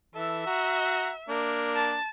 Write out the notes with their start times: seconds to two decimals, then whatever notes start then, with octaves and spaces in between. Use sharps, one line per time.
0.15 E3 A4 E5
0.46 F#4 F#5 A#5
1.29 A#3 D4 A#4
1.75 A5